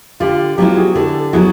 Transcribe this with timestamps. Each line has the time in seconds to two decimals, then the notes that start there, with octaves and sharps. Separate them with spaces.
0.20 D3 F4 G4
0.58 F#3 B3 E4 F4 G4
0.76 F#4 G#4
0.95 D3 G4 A4
1.33 F#3 B3 E4 F#4 G#4